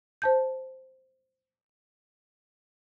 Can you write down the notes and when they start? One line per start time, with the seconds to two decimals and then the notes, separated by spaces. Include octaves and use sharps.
0.22 C5 A5 G6